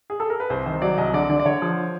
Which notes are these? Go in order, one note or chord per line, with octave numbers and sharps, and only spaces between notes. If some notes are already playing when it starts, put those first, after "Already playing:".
G#4
A4
A#4
B4
C2 C5
D#3 C5
F#3 D5
C2 D#5
D3 D5
D3 D5
D5
D3 C#5
F3